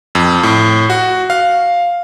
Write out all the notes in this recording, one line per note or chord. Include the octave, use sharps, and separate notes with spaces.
F2
A2
F#4
F5